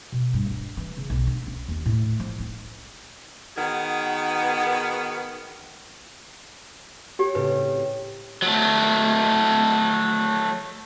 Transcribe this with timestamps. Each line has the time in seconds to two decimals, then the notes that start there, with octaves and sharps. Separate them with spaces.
0.12 B2
0.34 G2
0.51 D4
0.77 E3
0.97 C#3
1.10 B1
1.27 D3
1.47 C#4
1.69 D#2
1.86 A2
2.20 F3
2.40 D#4
3.56 D#3 B3 F#4 G#4
7.19 G4 C#5 G5
7.35 A2 C#3 C4 B4
8.42 F#3 A3